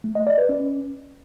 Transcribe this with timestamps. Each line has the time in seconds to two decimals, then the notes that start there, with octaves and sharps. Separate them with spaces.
0.04 A3
0.15 D#5
0.27 D5
0.38 B4
0.49 C#4